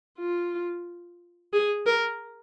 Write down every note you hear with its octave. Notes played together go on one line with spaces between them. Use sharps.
F4
G#4
A#4